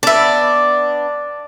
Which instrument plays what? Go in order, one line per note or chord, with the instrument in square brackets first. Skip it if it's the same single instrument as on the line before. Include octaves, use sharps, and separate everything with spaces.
[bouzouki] B3 D4 [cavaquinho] D5 E5